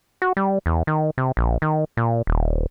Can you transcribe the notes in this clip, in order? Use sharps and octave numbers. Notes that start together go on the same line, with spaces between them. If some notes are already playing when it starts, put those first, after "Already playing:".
F#4
G3
E2
D#3
C3
A#1
D#3
A#2
D#1